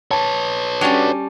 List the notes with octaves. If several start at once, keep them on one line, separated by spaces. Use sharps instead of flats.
B4 C#5 A5
G3 C#4 D4 F#4 D5